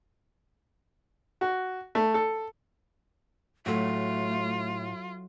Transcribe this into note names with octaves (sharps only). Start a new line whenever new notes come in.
F#4
A3
A4
A2 F#3 A3 F4 A4